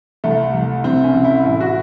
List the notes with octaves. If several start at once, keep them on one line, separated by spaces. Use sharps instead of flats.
C2 A3
C2
C2 C4
C#4
C2
E4
A1 E4
F#4